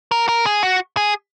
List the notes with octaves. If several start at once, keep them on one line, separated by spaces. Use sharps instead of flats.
A#4
A#4
G#4
F#4
G#4